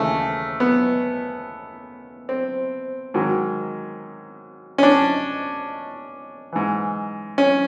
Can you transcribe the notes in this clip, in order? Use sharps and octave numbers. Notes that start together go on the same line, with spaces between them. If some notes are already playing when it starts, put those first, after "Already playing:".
Already playing: D#2 C#3 E3 A3
B3
C4
G#2 D#3 F#3
C#4
D4
G#2 E3
C#4